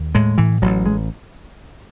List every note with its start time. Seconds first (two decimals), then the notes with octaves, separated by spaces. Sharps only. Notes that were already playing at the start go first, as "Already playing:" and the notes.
Already playing: D#2
0.15 A2 G#3
0.38 A2 E3
0.62 A1 F#3
0.86 G#3